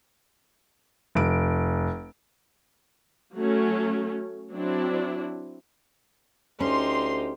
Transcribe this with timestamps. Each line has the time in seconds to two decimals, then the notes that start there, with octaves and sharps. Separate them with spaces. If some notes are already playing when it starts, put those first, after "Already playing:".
1.15 F1 D7
3.36 F#3 A3 C#4
4.51 F#3 C4 D4 E4
6.60 D2 C#4 D#4 G4 C6